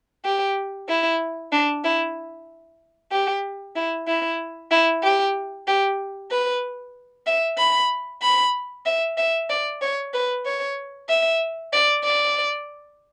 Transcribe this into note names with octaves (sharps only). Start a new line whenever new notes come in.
G4
E4
D4
E4
G4
E4
E4
E4
G4
G4
B4
E5
B5
B5
E5
E5
D5
C#5
B4
C#5
E5
D5
D5